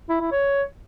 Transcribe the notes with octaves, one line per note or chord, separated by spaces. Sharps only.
E4
E4
C#5